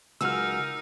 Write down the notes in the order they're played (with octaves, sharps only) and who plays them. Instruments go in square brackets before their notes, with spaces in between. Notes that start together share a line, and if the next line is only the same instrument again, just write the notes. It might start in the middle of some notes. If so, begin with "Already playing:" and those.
[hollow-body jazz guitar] C#2 [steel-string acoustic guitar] F#3 F4 G#4 [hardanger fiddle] D#4 A#4 [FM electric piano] E6 F6